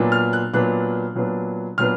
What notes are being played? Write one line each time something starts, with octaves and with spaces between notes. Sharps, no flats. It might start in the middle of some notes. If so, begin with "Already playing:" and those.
Already playing: A#2 F#3 B3 D4
F6
F#6
A#2 F#3 B3 D4 F#6
A#2 F#3 B3 D4
A#2 F#3 B3 D4 F6